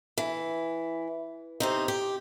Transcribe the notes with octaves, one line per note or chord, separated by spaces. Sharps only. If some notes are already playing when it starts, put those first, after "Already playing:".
E3
C3 C4 D#4
G4